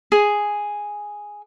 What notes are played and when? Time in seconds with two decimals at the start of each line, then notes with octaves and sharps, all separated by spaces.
0.12 G#4